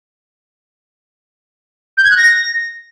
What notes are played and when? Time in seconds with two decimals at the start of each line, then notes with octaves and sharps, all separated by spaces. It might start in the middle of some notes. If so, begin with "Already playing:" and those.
1.97 G6
2.04 G#6
2.11 F#6
2.17 A#6